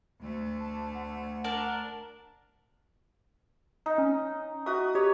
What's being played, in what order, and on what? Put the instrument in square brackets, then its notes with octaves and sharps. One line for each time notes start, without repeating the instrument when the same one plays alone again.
[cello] D2 A3
[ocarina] A5
F#5
[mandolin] D4 A#4 A5
[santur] D#4
[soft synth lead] C#4
[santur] F#4 D#6 [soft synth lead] E5
[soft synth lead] G4 [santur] C#5